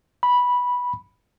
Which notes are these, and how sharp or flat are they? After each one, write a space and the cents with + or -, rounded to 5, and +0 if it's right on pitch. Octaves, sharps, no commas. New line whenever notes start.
B5 -10